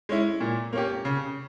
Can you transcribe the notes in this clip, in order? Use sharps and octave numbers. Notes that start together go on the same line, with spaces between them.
G#3 C#4 E4
A#2
A#3 C#4 G4
C#3